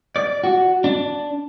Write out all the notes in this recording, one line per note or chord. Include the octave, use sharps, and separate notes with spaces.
D5
F#4
D4